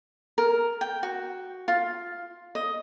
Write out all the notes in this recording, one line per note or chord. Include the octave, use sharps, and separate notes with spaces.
A#4
G5
F#4
F4
D#5